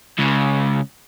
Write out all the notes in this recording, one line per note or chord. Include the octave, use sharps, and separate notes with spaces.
C#2 C#3